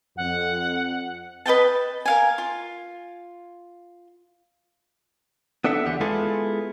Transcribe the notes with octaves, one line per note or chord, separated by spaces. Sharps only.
F2 F#5
B4 D#5 G5 A5
A#4 F5 G#5
F4
B3 D4 A4 E5 F#5
E2 D3 G4 F#5
G#3 B3 E4 F4 G#4 A4